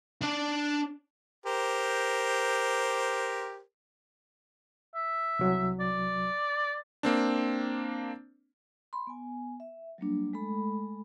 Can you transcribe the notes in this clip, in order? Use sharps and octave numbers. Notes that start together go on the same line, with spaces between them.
D4 D5
G4 A#4 C5
E5
C2 F#3
D5
A#3 C4 D4
B5 C6
B3 G#5
E5
F#3 G3 A#3 D4
G#3 A3 A4 B5